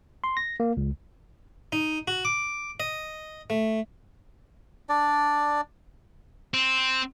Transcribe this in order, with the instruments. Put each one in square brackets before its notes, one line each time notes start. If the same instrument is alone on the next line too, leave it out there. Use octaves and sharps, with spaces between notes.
[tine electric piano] C6
A#6
A#3
C#2
[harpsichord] D#4
F#4
D6
D#5
A3
[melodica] D4 D5
[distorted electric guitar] C4